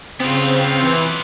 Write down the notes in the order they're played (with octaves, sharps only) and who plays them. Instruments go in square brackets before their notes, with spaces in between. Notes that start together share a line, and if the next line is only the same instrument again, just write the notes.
[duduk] C#3 [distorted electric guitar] B3 F4 [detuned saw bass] C4
[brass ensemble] E3